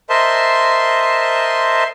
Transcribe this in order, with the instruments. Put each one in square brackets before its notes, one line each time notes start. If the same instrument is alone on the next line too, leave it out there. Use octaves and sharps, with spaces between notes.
[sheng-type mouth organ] A#4 C5 D#5 E5 A5 C6